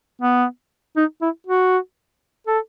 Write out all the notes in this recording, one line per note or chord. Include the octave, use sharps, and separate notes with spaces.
B3
D#4
E4
F#4
A4